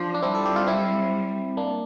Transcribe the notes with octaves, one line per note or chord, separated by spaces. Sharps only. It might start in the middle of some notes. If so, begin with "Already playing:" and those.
Already playing: F3 D4 F4
D4
G3 C4 E4
A4
G4
F4
C4 E4
A#3 D4